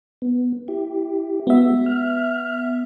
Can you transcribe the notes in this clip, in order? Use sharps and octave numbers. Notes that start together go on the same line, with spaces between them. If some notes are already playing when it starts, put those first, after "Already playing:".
B3
E4 G4
G#3 B3 F#4 E5
F6